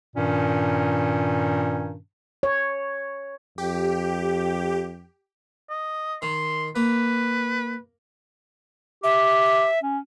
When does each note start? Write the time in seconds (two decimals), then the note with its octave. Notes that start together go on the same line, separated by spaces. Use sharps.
0.16 G2 A#2 D#3 C#4
2.43 C#5
3.58 F2 G4
5.70 D#5
6.22 D#3 C6
6.76 A#3 B4
9.04 G4 E5
9.83 C#4